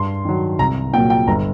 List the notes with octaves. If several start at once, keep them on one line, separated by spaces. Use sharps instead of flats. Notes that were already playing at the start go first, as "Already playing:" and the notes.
Already playing: G2 C6
D#3 F#3
C2 A#5
A#2 F#3 A#3 G5
G5
G1 A#5